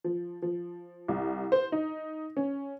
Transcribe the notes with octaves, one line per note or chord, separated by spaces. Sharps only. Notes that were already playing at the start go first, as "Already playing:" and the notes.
F3
F3
C2
C5
D#4
C#4